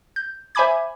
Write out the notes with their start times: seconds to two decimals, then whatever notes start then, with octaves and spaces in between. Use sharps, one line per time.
0.16 G6
0.55 C5 E5 G#5 B5 D6 G#6